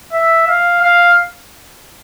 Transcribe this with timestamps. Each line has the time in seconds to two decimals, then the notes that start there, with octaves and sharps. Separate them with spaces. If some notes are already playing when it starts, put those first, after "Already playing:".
0.13 E5
0.48 F5
0.82 F5